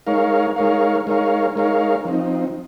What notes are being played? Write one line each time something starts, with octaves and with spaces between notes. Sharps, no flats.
G#3 D#4 A#4 C#5 F5
G#3 D#4 A#4 C#5 F5
G#3 D#4 A#4 C#5 F5
G#3 D#4 A#4 C#5 F5
F3 C4 D#4